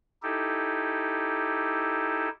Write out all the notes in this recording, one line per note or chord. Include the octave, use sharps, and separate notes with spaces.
D#4 E4 G4 A4